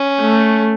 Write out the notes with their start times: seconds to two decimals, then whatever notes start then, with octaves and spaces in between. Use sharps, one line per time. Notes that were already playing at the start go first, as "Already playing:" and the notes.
Already playing: C#4
0.20 A3